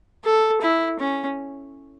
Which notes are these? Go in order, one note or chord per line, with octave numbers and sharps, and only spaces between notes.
A4
E4
C#4